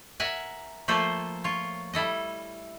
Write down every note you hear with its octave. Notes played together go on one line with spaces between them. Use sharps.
A#4 E5 F#5 G#5
F3 A3 A#3 F4 A4 C5
F4 C#5
G3 E4 A4 D#5